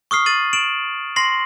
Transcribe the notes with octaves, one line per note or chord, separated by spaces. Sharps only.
C#6 D#6 F6 C7
A6 D#7 F#7
D7 E7 F#7
C6 A#6 C7 F#7